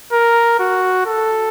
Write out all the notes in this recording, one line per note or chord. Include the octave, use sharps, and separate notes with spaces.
A#4
F#4
A4